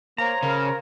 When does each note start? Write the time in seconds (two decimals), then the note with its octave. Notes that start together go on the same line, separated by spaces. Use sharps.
0.18 A#3 C5 C#5 F5 A#5
0.43 C#3 A#4